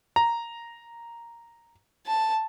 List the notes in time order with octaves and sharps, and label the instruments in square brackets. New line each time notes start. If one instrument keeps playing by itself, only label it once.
[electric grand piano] A#5
[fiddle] A5